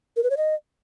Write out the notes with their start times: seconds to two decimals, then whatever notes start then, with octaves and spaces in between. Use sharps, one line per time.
0.16 A#4
0.23 B4
0.30 C#5
0.37 D#5